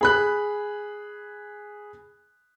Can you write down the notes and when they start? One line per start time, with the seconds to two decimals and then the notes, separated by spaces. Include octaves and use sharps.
0.01 G#4 B5 F#6